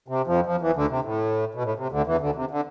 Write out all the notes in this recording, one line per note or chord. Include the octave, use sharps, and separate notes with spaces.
C3
F2 F3
F2 F3
E2 E3
D2 D3
C3
A2
B2
A2
C3
D2 D3
E2 E3
D2 D3
C3
D3